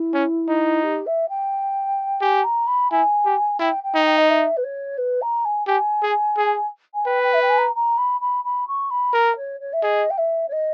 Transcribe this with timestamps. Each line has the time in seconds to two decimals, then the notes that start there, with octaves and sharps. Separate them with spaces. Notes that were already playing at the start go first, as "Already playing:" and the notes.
Already playing: E4
0.14 C#4
0.48 D#4
0.84 G4
1.07 E5
1.29 G5
2.21 G4 G#5
2.44 A#5
2.67 B5
2.91 E4 G#5
3.25 G4
3.59 E4 G5
3.84 G5
3.94 D#4
4.06 G5
4.18 D#5
4.30 E5
4.57 B4
4.64 C#5
4.98 B4
5.22 A#5
5.45 G#5
5.67 G4 G#5
6.02 G#4
6.37 G#4
6.94 G#5
7.06 B4 G5
7.23 G5
7.34 E5
7.42 G5
7.50 G#5
7.58 A#5
7.76 A#5
7.98 B5
8.21 B5
8.45 B5
8.68 C#6
8.91 B5
9.13 A#4 A#5
9.36 C#5
9.61 C#5
9.73 E5
9.83 G#4 D#5
10.11 G5
10.18 E5
10.49 C#5
10.52 D#5